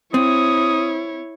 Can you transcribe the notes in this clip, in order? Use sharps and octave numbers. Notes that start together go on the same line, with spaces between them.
C4 E4 C#5 D#6